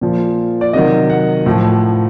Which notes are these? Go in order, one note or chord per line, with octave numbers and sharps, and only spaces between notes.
A#2 F3
D5
C3 D#3 F#3 D#5
F#5
A2 F3